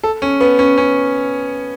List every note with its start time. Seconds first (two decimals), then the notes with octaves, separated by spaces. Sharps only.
0.03 A4
0.22 C#4
0.41 B3
0.59 C#4
0.78 C#4